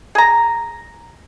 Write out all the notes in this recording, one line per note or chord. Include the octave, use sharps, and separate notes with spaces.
G#4 A#5